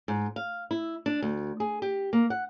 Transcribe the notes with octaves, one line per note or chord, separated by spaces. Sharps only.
G#2
F5
E4
D4
D2
G#4
G4
A#3
F#5